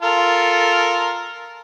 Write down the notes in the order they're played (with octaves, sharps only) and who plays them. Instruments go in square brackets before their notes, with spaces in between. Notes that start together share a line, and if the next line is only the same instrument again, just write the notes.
[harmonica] F4 A4 A#4